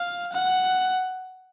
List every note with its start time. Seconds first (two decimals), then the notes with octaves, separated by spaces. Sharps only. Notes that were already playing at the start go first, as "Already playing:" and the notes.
Already playing: F5
0.33 F#5